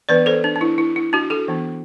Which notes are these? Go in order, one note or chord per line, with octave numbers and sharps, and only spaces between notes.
E3 B3 D4 B4 D5
A4 C5
D4
D4
E4
E4
E4
D4 F#4
F#4 A4
E3 B3 D4